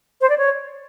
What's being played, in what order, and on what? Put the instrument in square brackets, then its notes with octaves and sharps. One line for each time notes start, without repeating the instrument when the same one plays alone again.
[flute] C5
D5
C#5